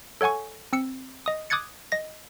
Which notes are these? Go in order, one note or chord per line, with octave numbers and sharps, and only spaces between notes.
A4 C#5 F#5 G#5 C#6
C4 E6 C#7
D#5 D#6
D6 D#6 F#6 G#6 A6 C#7
D#5 A#6